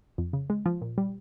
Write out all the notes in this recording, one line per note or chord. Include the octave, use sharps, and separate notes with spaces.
F2
C#3
G#3
F3
A#2
G3